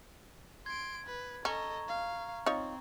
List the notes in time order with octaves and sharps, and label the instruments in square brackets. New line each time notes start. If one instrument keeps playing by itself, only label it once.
[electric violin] C6 D7 [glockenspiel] G#6
[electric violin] B4
[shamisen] C#4 [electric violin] A4 D#5 [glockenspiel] A#5 C#6
[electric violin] F5
[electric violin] C4 [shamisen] D#4 F4 C#5